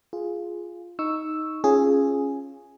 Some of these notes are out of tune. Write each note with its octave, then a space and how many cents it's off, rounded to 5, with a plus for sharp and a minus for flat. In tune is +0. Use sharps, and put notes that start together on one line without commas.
F4 +0 G#4 +0
D#4 +5 C#6 +0 E6 +0
C#4 -10 F4 -10 G#4 +0